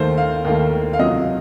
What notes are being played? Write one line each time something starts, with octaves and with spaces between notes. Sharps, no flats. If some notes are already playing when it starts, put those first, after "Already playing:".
Already playing: D#2 D#3 A3 C5
F5
D#2 D#3 A3
F5
C#2 C3 F#3 D#5